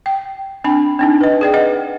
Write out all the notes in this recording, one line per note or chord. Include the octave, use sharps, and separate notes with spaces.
G5
C4 D4 G5 B5
C4 D4 D#4
B4 D#5
G#4 D5 G5
B4 D#5 F#5